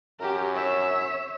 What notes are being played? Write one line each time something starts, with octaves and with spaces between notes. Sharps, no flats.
F#2 G4 A#4
C#5 E5